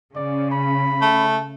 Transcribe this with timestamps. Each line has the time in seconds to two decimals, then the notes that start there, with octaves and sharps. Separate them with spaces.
0.16 C#3 D5
0.52 B5
1.01 A3